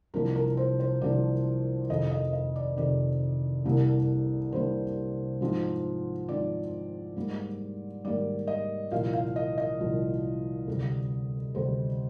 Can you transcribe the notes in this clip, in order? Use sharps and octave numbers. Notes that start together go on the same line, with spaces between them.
C2 C3 F3 A#3 D4 A#4
A#4
C5
C5
C2 C3 F3 A#3 D4 D5
F2 C3 D#3 D#5
D#5
D#5
D5
F2 C3 D#3 D5
C2 C3 G3 A#3 D4
C2 C3 G3 A#3 D4 C5
G#2 F3 C4 D#4
G#2 F3 C4 D#4 D5
G#2 G3 A#3
G#2 G3 A#3 D5
D#5
C2 A#2 F3 F5
F5
D#5
D#5
C2 A#2 F3
D2 C3 G3
D2 C3 G3 C5